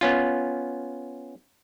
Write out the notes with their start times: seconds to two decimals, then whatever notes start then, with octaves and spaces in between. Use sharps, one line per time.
0.01 B3 C#4 F4